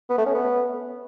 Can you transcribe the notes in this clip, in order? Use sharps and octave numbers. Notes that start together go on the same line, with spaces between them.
B3
A3
C#4
B3